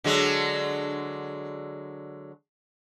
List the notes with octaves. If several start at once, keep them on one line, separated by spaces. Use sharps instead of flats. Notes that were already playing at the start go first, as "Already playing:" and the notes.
D3 F#3 G#3